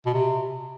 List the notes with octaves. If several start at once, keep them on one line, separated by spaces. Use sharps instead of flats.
B2
C3